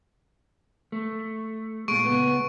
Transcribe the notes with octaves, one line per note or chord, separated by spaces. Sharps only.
A3
A#2 G#3 C#6 D7
C#2 B3